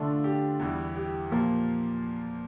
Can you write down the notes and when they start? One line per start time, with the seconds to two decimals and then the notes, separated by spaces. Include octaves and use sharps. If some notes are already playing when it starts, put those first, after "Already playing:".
Already playing: D3 A3 D4 F4
0.24 G4
0.59 E2 E3 G3
0.96 G4
1.31 A#2 F3 A#3